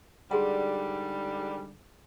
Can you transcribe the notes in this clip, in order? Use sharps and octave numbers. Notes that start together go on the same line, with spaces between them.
G#2 D3 G3 F#4 G#4 F#5